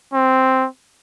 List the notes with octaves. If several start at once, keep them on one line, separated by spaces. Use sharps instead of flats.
C4